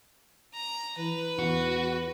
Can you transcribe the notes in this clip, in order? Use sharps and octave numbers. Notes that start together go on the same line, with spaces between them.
A#5
E3 B4
E2 F#4